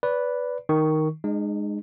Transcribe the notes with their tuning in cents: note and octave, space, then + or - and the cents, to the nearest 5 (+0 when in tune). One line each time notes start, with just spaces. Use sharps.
B4 +0 D5 -20
D#3 +0 C#6 +0
G#3 +0 D#4 -40